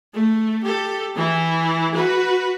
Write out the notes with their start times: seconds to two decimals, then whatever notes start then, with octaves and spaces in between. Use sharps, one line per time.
0.14 A3
0.64 G4 A4
1.16 E3 E4
1.95 F#4 B4